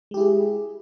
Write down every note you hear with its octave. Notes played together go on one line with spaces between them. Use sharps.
G#3 E4 G4 G#4